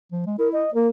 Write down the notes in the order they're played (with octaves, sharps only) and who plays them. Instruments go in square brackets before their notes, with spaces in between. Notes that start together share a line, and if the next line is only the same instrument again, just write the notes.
[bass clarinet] F3
G#3
[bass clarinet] E4 [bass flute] A#4
[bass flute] D#5
[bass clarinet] A#3 [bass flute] A#4